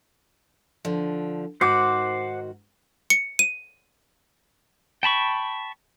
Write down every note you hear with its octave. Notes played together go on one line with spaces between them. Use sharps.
D3 F3
G#2 D#3 F#4 C5 F#5 D6
C#7
D#7
G5 A5 B5 C#6